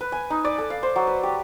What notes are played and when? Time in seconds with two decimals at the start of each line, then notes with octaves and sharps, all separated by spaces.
0.01 B4
0.12 G#5
0.30 D#4
0.45 D5
0.58 A4
0.70 F5
0.83 C5
0.96 F#3
1.07 B4
1.23 G4